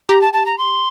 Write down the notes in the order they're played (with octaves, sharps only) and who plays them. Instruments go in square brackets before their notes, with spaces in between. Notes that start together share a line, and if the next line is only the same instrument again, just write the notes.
[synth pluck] G4 [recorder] A#5
[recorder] A5
A5
A#5
C6